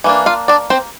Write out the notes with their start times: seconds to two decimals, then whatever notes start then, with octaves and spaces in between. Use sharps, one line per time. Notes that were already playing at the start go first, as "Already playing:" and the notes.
0.04 E3 A#3 D4
0.26 F4 F5
0.48 D4 D5
0.70 C4 C5